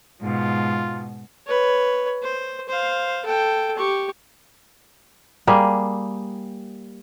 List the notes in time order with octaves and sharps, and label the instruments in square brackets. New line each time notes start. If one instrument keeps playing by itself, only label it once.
[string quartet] G#2 B2 [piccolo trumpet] F4
[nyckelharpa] B4 C#5
C5
C5 F5
A4 G5
G4 C#6
[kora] G3 A#3 G#4